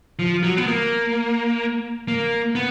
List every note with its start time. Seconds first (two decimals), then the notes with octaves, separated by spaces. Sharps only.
0.19 F3
0.43 F#3
0.57 B3
0.67 A#3
2.08 A#3
2.55 B3